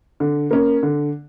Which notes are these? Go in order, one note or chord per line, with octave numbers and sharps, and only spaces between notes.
D3
A#3 C#4
D3